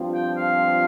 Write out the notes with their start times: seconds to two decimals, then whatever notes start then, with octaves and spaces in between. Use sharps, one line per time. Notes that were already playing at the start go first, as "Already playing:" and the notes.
Already playing: G2 F3 C4 F4
0.14 G5
0.37 F5